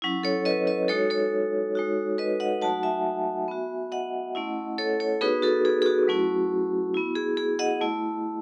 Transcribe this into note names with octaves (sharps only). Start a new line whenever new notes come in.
F#3 C#4 E4
A4 C#5
B4 D#5
B4 D#5
G#3 D#4 F#4 A4 C#5
A4 C#5
G#3 D#4 F#4
B4 D#5
D#5 F#5
F#3 A3 D#4 F#4 F#5 A5
E5 G#5
B3 F#4
D#5 F#5
A3 C#4 E4
A4 C#5
A4 C#5
B3 D#4 F#4 G#4 B4
F#4 A4
G#4
G#4
F#4
F#3 A3 C#4 E4
B3 E4
G#4
G#4
D#5 F#5
A3 E4